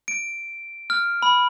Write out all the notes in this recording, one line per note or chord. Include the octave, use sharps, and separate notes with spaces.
D7
F6
B5